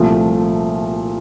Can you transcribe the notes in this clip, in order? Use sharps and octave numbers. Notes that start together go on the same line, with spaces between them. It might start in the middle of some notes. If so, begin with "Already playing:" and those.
Already playing: C2 A#2 F3 A3